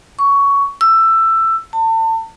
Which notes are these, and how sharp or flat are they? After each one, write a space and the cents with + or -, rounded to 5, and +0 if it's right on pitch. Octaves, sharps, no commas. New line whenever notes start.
C#6 +15
E6 +15
A5 +35